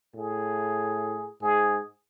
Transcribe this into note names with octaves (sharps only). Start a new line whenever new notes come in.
A2 G#4
G#2 G#4